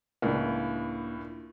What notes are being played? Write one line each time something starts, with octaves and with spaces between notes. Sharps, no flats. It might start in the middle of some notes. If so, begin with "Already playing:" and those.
C#2 A2 A#3 D4